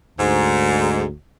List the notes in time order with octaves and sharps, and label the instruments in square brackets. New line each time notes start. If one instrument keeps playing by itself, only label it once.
[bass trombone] D2 [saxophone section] G#2